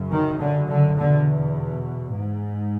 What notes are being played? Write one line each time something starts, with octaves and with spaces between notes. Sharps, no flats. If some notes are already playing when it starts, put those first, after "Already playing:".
Already playing: F#2 C#3
D#3
D3
D3
E2 B2 D3
G#2